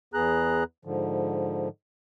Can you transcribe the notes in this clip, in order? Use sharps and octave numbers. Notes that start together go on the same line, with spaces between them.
E2 B3 G#4 A#5 F#6
G#2 D3 F3